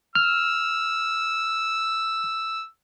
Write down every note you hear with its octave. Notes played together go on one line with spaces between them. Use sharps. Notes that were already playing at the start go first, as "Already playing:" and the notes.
E6 F6